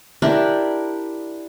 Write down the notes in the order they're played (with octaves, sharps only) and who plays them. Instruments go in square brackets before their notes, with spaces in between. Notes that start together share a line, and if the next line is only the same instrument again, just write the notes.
[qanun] D4 E4 G4 A#4